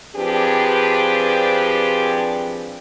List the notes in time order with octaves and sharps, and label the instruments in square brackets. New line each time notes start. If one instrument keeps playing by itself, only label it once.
[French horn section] F3 C4 D4 G4 G#4 B4